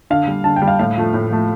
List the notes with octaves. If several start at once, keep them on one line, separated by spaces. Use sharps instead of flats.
D3 F5
G3
D3 A5
G5
G3
F5
A2 F5
F3 A3
A2
F3 A3